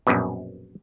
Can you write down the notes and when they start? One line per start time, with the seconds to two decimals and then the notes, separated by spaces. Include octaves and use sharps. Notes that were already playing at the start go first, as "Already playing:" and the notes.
0.07 A#1 F#2 B2